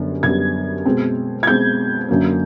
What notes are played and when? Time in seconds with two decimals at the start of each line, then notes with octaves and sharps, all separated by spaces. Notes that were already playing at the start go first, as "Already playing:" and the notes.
Already playing: F#2 D3 G3 B3
0.23 F#2 D3 G3 B3 G#6
0.85 B2 G#3 C4
1.43 G#6
1.47 B2 G#3 C4 G6
2.09 F#2 D3 F#3 A#3 C#4